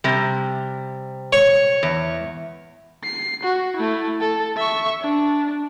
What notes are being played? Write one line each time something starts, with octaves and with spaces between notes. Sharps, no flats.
C3 G3
C#5
E2
C7
F#4
A3 E4
A4
E5 C#6
D4